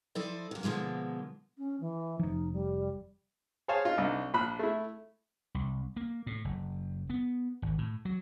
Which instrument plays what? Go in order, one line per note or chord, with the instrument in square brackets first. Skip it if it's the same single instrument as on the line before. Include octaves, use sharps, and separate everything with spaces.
[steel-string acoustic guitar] F3 E4 A4 C5 D5 D#5
C3 A#3
B2 D3 F3 G#3 A#3
[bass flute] C#4
E3
[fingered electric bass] F1 F3 [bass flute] D#4
[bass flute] G3
[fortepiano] G#4 C5 C#5 F5 G#5 A5
D#4 F4
C2 D4 D#4
A#1 B5 F#6
A3 E4
[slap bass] C2
A#3
A2
F#1
B3
G#1
A2
F#3